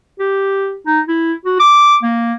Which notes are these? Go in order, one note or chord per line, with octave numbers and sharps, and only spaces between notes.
G4
D#4
E4
F#4
D6
A#3